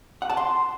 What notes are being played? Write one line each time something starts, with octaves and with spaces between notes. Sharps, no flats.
F#5
A5
C6